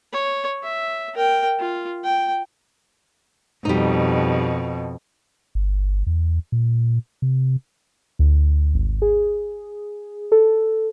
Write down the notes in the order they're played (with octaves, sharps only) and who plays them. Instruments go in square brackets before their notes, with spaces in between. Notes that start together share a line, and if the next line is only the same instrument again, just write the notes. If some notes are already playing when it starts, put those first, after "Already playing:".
[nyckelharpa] C#5
E5
A#4 G5
F4
G5
[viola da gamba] F2 B2 [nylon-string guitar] G3 D#4
[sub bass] G1
E2
A#2
C3
[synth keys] D2
G#1
G#4
A4